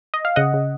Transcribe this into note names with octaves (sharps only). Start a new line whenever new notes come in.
D#5
F5
C#3 D#5 F#5
C#3